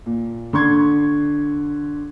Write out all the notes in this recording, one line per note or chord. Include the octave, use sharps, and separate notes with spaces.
A#2
D3 C6 C#6 G#6